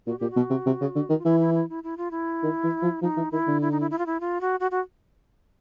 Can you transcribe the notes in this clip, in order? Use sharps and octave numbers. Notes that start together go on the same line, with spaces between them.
A#2 F#4
A#2 G4
F#4
B2
C3
C3
C#3
D3
D#3
F4
E3 E4
E4
E4
E4
E4
F4
E4
D#3
E3
F3
F3 D#4
E3
D#3 E4
D3
E4
D#4
E4
E4
F4
E4
F4
F#4
F#4
F#4